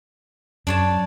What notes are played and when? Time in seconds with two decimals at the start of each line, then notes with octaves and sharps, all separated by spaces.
0.67 F#2 D4 C#5 A5